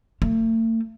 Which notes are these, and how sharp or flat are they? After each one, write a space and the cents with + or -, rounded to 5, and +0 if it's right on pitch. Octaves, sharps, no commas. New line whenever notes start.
A3 +40